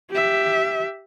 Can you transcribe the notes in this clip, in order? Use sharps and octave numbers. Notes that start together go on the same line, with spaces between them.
G4 E5